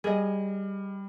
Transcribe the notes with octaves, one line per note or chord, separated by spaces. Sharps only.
G3 G#4 D#5